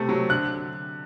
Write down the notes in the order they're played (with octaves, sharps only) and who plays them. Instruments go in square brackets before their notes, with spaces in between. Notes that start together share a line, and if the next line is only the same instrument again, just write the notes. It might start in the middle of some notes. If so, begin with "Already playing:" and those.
Already playing: [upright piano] C3 A3 C4
F#3
D3 F#6